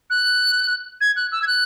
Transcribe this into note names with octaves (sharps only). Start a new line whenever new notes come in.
F#6
G#6
F#6
E6
G#6
F#6